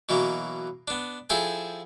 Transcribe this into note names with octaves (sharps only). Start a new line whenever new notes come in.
B2 E3 F#3 A#3
B3 D4
F3 E4 G#4 A4 G5 G#5